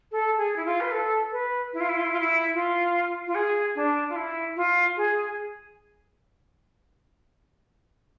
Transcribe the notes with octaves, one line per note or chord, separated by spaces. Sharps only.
A4
G#4
E4
F4
B4
A4
B4
E4
F4
E4
F4
E4
F4
E4
F4
F4
G#4
D4
F4
E4
F4
G#4